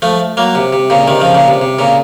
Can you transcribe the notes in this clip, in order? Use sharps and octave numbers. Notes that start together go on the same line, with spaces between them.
F3 A3
F#3 A#3
C3
C3
A#2 C#3
C3 D#3
C#3 F3
A#2 C#3
C3
C3
A#2 C#3